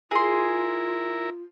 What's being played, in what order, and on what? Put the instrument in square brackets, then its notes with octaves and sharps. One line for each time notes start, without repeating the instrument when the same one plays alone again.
[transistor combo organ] E4 A#4 [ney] F4 [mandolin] G#4 C6